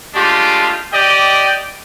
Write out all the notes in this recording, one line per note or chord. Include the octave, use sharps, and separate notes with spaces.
G#3 A3 D4 F4 G4
G4 D5 D#5 G5